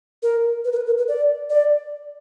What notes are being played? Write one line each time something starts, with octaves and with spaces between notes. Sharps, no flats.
A#4
B4
A#4
B4
A#4
B4
D5
D5